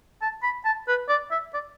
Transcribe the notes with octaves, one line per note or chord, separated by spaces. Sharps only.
A5
B5
A5
B4
D5
E5
D5